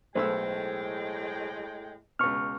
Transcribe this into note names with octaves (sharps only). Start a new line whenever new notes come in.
B1 A2 G#3 A3 C5 G5 E6
C#2 B2 C#6 F6